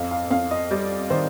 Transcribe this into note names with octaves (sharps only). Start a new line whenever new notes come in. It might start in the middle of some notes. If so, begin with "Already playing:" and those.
Already playing: F2 F5
F5
F2 F5
D#5
G3 D5
D#3 C5